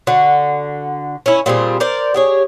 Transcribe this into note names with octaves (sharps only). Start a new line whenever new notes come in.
D3 F#4
C#4 E4
A#2 G3 C4 G#4
A#4 C5 D5
G4 G#4 C#5